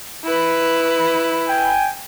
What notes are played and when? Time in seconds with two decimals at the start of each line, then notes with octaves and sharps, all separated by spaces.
0.24 E4 B4
1.48 G5 G#5